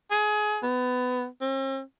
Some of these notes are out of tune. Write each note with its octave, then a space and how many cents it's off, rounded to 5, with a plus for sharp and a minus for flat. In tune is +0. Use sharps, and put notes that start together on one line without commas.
G#4 +25
B3 +20
C4 +45